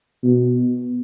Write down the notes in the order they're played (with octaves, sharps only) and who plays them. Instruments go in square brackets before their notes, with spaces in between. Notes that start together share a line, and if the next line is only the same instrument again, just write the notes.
[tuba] B2